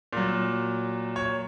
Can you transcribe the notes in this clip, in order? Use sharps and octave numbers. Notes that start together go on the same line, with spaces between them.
A#2 F#3
C#5